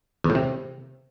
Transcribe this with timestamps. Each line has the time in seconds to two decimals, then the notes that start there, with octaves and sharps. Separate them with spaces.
0.24 E2
0.30 A2
0.35 C3